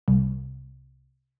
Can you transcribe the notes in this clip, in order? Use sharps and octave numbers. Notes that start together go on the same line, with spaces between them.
C2